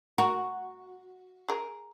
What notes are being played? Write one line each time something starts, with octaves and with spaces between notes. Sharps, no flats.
F#4 A#4
G#4 A#4